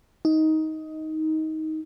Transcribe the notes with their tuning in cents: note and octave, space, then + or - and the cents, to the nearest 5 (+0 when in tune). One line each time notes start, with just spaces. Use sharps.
D#4 +15